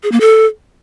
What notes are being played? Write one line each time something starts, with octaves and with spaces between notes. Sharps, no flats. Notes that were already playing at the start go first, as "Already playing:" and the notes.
G#4
A#3
A4